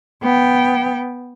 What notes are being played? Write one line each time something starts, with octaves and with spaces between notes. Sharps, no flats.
B3 G5